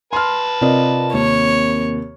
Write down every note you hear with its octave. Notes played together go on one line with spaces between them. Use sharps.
B4 A5 C6 F6
C3 C4 F4 A#4 D5 D#5
D#2 C#5